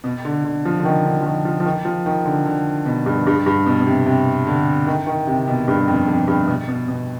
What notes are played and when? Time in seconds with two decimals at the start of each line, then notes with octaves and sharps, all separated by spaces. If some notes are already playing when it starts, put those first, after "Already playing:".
0.04 B2
0.25 D3
0.44 D3
0.65 F3
0.80 D3
0.85 D#3
1.05 D3
1.20 F3
1.25 D#3
1.45 F3
1.60 F3
1.66 D#3
1.85 F3
2.06 D#3
2.26 D3
2.46 D3
2.86 B2
3.06 G2
3.27 G2
3.46 G2
3.66 B2
3.81 B2
3.87 C3
4.07 C3
4.47 D3
4.87 D#3
5.07 D#3
5.27 C3
5.48 B2
5.68 G2
5.88 F2
6.08 F2
6.28 G2
6.47 B2
6.68 B2
6.88 B2